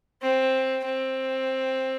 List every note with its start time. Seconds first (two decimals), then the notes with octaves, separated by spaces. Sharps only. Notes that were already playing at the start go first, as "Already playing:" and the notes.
0.22 C4
0.85 C4